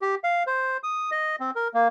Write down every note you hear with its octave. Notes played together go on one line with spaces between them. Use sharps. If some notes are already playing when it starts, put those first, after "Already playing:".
G4
F5
C5
D#6
D#5
C4
A#4
A#3